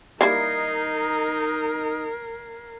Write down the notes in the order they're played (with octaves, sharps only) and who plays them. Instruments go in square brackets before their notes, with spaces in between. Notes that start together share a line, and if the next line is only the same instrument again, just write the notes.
[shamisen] G3 A#3 E4 [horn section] D#4 [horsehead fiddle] A#4 [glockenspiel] G#6 C7